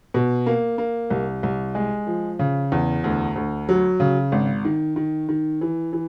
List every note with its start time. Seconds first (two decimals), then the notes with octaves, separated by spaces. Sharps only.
0.14 B2
0.46 A#3
0.78 A#3
1.10 C2
1.43 C2
1.75 G#3
2.07 F3
2.39 C#3
2.72 E2
3.04 D2
3.36 D2
3.69 F#3
4.00 C#3
4.32 G#1
4.65 D#3
4.96 D#3
5.29 D#3
5.61 E3
5.93 E3